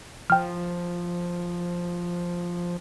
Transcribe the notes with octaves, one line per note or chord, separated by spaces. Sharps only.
F3 G5 F6